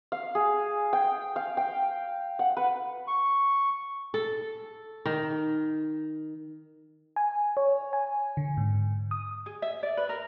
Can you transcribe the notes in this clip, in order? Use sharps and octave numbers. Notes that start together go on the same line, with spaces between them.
F5
G#4
G5
F5
G5
F#5
B4
C#6
A4
D#3
G#5
C#5
G#5
D3
G#2
D#6
G#4
E5
D5
B4
A#4